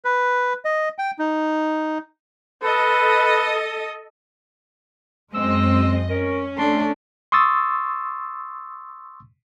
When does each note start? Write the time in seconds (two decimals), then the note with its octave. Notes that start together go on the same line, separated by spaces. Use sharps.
0.05 B4
0.65 D#5
0.98 G5
1.19 D#4
2.63 A4 B4 D#5
5.35 F#2 G#3 C4 D#5 E6
6.10 C#4 A#4
6.58 A3 D4 C6
7.32 C6 C#6 D#6 E6 A6